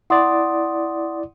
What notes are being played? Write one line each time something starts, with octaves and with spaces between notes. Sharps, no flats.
E4 D5 F#5 C6 D#6